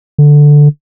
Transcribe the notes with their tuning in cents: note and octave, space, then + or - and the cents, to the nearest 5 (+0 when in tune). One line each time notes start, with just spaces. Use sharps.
D3 +0